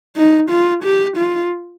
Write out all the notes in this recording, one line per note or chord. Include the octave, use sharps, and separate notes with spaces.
D#4
F4
G4
F4